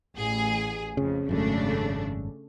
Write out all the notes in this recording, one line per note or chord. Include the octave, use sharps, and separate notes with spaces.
A1 G#4
F2 C#3
G#1 F#2 C#3 G#3 A3 D4